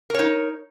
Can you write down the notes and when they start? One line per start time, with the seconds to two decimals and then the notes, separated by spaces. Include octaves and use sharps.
0.10 A#4
0.14 C#5
0.19 D#4